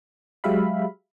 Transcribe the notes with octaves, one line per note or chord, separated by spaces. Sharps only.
F#3 G#3 G4 E5 F5 B5